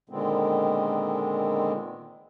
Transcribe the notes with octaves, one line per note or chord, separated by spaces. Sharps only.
A#2 D3 D#3 G#3 B3 C4